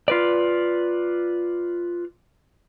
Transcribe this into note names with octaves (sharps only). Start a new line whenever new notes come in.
F4 B4 D5